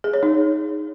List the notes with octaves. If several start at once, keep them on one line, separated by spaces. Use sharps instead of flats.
G#4
C#5
D#4